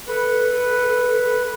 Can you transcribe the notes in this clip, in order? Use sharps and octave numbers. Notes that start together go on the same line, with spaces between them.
A4 B4